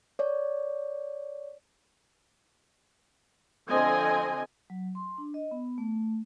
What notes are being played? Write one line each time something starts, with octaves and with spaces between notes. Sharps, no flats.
C#5 D5
D3 F3 C4 D#5 G#5
F#3
C6
D4
D#5
B3
A3